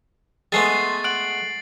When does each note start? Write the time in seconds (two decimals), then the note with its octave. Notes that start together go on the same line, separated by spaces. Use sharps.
0.52 G#3 A3 B3 G#5 C6 A6 C7
1.04 F#5 D7 F#7